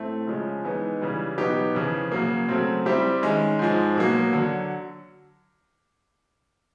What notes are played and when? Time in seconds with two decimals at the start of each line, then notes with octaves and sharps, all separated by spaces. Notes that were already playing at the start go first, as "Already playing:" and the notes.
Already playing: A2 A3 C4
0.27 C#3 F3 G#3 C#4
0.64 E3 G#3 B3 D#4
1.01 C#3 E3 G3
1.38 B2 F#3 B3 D#4 G4
1.75 F2 C#3 E3
2.12 C#3 F#3 A#3
2.48 C#3 F#3 A3 C4
2.86 G3 C4 E4 G4 C5
3.23 D#3 G#3 C#4
3.59 G#2 F3 G#3
3.96 B2 F#3 A#3
4.33 D3 F#3